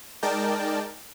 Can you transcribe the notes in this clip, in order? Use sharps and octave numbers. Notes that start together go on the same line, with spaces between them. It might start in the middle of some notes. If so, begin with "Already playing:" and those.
G#3 D#4 A#4 D5 G5 A5